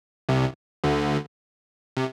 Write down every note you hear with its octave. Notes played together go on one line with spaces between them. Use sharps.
C2 C3
D2 D3
C3